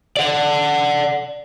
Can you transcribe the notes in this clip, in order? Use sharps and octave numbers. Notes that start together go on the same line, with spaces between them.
D5 F#5